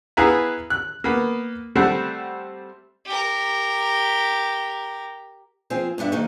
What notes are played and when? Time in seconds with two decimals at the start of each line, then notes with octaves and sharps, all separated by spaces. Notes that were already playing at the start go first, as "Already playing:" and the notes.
0.17 B3 E4 G#4 B4 F5 A#5
0.70 F#6
1.04 A#3 B3
1.75 G3 A3 C4 F#5 A5
3.05 G4 A#4
5.70 F3 C4 G#4
5.98 G2 B3 D4 E5
6.12 D#3 F#3 A#3 C4 D4 D#4